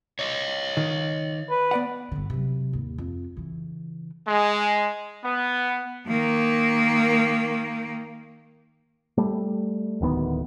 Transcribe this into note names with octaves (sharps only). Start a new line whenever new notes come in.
C#5 D#5
D#3
B4
B3 D5 F#5
G1 D3
C3 F#3
D#2 G#2
F2
C#3 E3
G#3
B3
D#3 A#3
G3 A3
D1 D2 D#3 B3